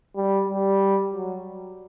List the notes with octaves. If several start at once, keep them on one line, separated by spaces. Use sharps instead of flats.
G3
G3
F#3